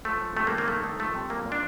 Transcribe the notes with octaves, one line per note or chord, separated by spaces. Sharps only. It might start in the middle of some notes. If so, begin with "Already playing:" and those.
F3 A3
F3
C3 A3
A#3
D#3
A#3
D#3 A3
D#3 A3
F3 A3
C3
A#2 A#3
A#2
D4